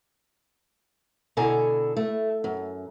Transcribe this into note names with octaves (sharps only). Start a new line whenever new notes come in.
B2 D3 E4 A4 G#5 A#5
A3
F#2